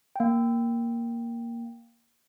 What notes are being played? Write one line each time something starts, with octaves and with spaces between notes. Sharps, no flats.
A#3 G5